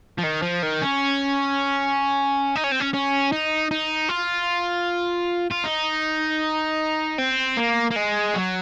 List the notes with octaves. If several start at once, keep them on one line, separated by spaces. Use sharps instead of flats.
F3
D#3
F3
D#3
C#4
D#4
C#4
C4
C#4
C#4
D#4
D#4
F4
F4
D#4
C4
A#3
A#3
G#3
F#3